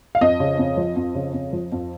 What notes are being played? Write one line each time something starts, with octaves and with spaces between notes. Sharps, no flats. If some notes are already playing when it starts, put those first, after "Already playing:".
F5
F2 D#5
C#3
F2
F3
F2
C#3
F2
F3
F2